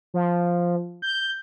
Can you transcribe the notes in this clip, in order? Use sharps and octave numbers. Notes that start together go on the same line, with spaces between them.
F3
G6